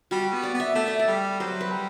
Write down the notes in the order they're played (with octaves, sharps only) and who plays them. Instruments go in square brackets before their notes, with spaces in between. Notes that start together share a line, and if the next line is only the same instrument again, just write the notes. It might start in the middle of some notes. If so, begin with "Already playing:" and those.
[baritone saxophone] G3 [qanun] F#4
[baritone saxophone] B3
[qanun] D5
[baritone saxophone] B3
[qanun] E5
[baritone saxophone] A3 [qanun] D5
[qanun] E5
D5
[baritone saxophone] G3
[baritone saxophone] F#3 [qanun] C5
[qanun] B4
[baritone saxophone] G3